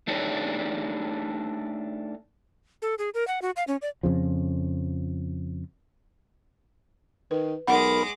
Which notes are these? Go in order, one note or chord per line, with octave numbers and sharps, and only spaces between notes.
A3 D4 D#4 G4 G#4 C#5
A4
G#4
A#4
F#5
F#4
F5
C#4
D5
F2 C#3 F3
D#3 B4
B1 G#3 A#4 F#5 B5 D6